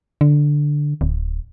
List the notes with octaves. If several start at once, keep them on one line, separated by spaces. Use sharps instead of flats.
D3
D1